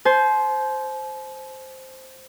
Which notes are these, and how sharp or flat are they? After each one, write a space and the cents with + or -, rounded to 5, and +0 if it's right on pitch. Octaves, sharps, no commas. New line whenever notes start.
C5 +0 A5 -45